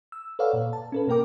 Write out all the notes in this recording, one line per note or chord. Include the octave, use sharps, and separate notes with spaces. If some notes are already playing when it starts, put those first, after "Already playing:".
E6
A4 B4 C#5 D5 F5 F#5
A#2
A5
C#4 A4 B4
B2 A#3 A#4 G5 D6